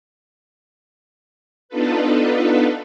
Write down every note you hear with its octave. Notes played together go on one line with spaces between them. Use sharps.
B3 D4 D#4 F4 A4 B4